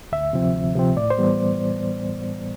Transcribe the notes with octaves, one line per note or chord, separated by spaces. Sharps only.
D2 E5
C3 F3 C4
D2
C3 F3 C4
A2 D5
C5
E3 G3 B3